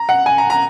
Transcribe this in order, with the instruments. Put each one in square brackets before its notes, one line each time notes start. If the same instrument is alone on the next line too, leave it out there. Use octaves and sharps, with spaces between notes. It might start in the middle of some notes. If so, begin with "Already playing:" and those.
Already playing: [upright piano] A#5
F#5
G#5
A#5
A#5